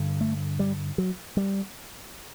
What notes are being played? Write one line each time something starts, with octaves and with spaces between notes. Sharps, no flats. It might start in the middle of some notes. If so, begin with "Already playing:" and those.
Already playing: G2 D3
A3
G3
F#3
G3